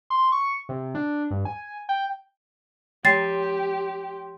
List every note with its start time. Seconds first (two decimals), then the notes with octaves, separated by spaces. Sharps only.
0.10 C6
0.32 C#6
0.69 C3
0.95 D4
1.31 G2
1.45 G#5
1.89 G5
3.05 F3 G4 G5 C6 A6 C7